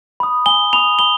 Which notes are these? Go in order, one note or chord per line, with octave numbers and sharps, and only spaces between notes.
B5 D#6
G#5 G7
B5 D#6 F7
B5 G7